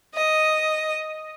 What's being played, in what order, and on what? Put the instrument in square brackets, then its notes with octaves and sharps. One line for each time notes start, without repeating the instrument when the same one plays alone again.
[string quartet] D#5